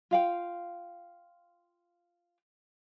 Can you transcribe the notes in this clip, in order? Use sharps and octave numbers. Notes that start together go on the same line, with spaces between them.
F4 F5 G5